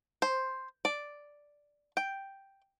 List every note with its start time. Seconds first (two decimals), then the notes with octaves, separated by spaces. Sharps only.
0.22 C5
0.85 D5
1.97 G5